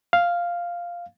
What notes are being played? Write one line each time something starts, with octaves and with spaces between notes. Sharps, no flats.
F5